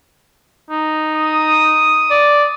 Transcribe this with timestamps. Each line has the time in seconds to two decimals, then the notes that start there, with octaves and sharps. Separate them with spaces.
0.71 D#4
1.15 D#6
2.11 D5